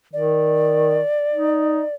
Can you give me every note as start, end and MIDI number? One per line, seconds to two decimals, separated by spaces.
0.13 0.99 51
0.13 1.95 74
1.33 1.82 63